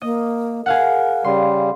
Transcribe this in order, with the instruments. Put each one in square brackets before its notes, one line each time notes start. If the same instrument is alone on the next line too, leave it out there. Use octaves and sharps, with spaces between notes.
[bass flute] A#3 [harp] D#5
[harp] G#4 F5 F#5 [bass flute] A#4
[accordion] C#3 G3 [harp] C6